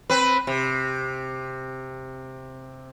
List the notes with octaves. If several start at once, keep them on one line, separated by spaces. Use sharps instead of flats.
C4 B4
C3